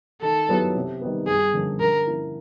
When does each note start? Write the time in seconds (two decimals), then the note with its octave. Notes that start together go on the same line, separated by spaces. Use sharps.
0.22 D#3 A4
0.49 F#3 B3 E4 G4
0.75 C3
1.01 D#3 G3 B3
1.27 G2 G#4
1.54 D3 F3 A#3 C#4
1.80 D3 A#4
2.07 F3 A#3 C#4 E4